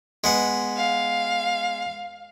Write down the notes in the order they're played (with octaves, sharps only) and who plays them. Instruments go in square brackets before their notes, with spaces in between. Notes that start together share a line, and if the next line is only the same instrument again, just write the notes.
[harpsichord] G#3 B3 F#5
[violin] F5